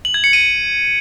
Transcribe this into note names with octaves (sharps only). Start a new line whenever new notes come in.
F#7
G#6
C#7
D#7